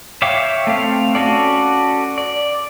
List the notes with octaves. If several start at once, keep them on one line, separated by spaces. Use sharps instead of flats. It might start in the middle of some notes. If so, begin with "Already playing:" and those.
C#5 E5 F5 G5 D6
A3 C4 F5
C#4 F#4 A4 D5
D5